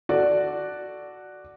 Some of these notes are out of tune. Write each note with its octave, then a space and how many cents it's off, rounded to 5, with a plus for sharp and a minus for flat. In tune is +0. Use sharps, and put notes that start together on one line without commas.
F#4 +0 A4 +0 D5 +0